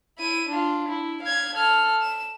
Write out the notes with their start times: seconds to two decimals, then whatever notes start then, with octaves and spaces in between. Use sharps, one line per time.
0.18 E4 D#7
0.49 D4 F4
0.89 E4
1.22 F5 G#6
1.55 A4 F6
2.02 E7